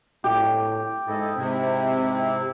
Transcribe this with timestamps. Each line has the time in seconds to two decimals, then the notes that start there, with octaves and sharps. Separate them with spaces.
0.24 A2 G4
1.07 G#2 E4 A4 D#5
1.36 G#2 C3 C4 E4
2.02 C4 E4